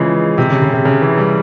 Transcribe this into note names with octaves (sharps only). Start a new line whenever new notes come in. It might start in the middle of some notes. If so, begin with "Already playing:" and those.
Already playing: C#3 E3 F3 G#3
C3
C#3
C#3
C3
C#3
E3
G3